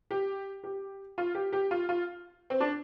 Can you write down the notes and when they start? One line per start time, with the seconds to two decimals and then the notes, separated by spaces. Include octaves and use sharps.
0.11 G4
0.64 G4
1.18 F4
1.35 G4
1.53 G4
1.71 F4
1.89 F4
2.50 C4
2.60 D4